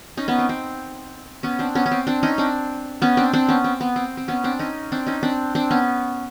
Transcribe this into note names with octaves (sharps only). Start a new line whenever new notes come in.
C#4 D#4
B3 C#4
C4
C4
B3 C#4
C4 D4
B3 C#4
C#4
C4
C4 D4
C#4 D#4
C4 D4
B3 C#4
C4 D4
C4 D4
B3 C#4
C4
B3
C4
C4
B3 C#4
C4 D4
C#4 D#4
C4 D4
C#4 D#4
C4 D4
C4 D4
B3 C#4